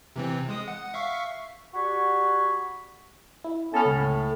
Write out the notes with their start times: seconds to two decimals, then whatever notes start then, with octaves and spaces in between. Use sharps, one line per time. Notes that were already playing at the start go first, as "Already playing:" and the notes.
0.16 C3 E3 C4
0.49 G#3 D#6
0.68 F#5
0.94 E5 F5 C#6
1.74 F#4 G4 D5 G#5 B5 C#6
3.44 E4
3.74 B3 C#4 A4 A5 F6
3.85 C#2 A2